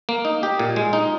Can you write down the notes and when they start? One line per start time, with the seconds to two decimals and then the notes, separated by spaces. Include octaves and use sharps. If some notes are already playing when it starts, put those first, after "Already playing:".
0.09 A#3
0.25 D#4
0.43 G4
0.59 A#2
0.76 G#3
0.93 D#4